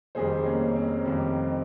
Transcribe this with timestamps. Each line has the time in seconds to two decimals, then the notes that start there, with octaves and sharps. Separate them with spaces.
0.15 F1 F2 D#3 G3 G#4 C5
0.45 A#3 C#4
0.76 C4
1.05 F1 F2 D#3 G3